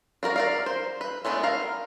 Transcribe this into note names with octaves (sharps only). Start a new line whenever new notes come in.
D4 F#4 A#4 D5
A#4 D5 F5
C5
B4
G#3 A3 B3 D4
A#4 F5